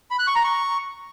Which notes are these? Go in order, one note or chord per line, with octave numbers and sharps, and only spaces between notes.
B5
F#6
C#6
A#5
C#6